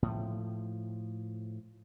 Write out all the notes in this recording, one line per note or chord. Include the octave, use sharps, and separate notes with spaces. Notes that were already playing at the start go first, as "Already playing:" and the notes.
A2 F3